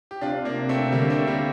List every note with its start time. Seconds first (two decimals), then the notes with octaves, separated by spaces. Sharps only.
0.11 G4
0.21 C3 D4 F4
0.45 A#3 D4
0.69 A3 C4
0.92 D3 G3 A#3
1.10 A3 C4
1.27 G3 A#3